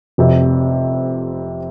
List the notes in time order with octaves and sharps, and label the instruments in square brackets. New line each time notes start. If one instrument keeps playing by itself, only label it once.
[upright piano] F1 F2 C3